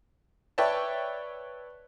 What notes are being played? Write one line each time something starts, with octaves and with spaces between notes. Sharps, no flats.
B4 C#5 D5 E5 G5 A5